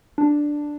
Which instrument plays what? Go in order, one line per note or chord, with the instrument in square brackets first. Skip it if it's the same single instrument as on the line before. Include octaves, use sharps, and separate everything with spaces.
[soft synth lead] D4